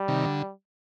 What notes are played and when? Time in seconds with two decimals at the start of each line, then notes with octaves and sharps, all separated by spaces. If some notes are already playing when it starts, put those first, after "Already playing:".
Already playing: G3
0.08 C3 D#3
0.25 D3